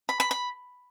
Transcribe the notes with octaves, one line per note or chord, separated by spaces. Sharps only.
B5
B5
B5